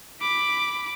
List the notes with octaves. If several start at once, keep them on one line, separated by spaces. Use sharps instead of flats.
B5 D6